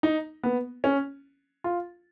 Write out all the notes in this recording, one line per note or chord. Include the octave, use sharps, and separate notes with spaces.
D#4
B3
C#4
F4